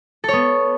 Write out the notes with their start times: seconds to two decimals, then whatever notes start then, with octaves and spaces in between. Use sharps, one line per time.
0.24 A4
0.28 C#5
0.33 B3